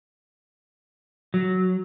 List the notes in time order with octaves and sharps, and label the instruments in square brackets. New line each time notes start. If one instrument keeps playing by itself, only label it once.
[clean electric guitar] F#3